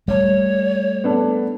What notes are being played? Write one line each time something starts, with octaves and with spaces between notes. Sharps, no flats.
G3 A3 C#5
B3 D4 A4